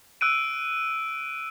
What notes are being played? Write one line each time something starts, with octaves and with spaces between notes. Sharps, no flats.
E6 F#6 D7 D#7